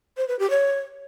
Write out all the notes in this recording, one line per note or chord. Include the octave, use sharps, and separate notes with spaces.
C5
B4
G4
C#5